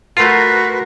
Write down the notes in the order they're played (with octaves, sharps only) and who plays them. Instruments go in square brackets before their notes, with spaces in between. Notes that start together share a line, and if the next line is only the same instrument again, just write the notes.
[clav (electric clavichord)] A3 F4 [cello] F#4 A#4 [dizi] B4 [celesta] F#5 C6 C7